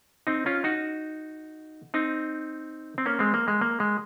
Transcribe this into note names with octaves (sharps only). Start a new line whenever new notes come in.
C4 D#4
C#4 F4
D#4 F#4
C4 D#4
C4
A#3 C#4
G#3 C4
A#3
G#3
A#3
G#3